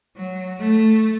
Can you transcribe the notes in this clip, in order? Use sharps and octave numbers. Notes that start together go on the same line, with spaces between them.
F#3
A3